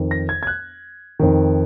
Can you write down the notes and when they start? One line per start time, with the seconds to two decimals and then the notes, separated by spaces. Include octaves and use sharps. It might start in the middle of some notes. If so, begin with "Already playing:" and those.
Already playing: F2 D#3
0.11 A#6
0.29 G#6
0.43 G#6
0.47 F#6
1.19 F2 D#3